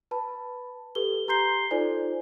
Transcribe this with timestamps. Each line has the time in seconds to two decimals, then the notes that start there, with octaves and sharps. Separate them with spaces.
0.11 B4 A5 B5
0.95 G4 A4 B4 G7
1.28 G4 A#5 C6 G6 C7 G7
1.71 D#4 F4 A4 C5 D5 G#5